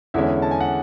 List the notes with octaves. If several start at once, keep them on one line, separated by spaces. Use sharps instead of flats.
E2 D3 G#3 C#4 E4 E5
A5
G#5
F#5